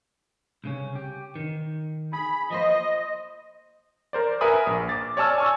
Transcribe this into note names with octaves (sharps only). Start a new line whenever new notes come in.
C2 C#3 C#4
G4
D#3
G#4 B5
F3 A#3 C5 D#5
A#4 C5 D5
A#4 B4 E5 G#5 B5 D#6
A#1
D6 A6
C#5 D5 G#5 A5 E6 F6
G#5 C#6 E6